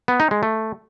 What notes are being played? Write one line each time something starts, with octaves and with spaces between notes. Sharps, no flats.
B3
D#4
G#3
A3